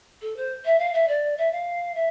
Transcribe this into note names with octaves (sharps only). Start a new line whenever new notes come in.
A4
C5
E5
F5
E5
D5
E5
F5
E5